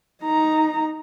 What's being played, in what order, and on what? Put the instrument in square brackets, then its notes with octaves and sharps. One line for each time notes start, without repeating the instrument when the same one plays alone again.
[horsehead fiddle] D#4 A#5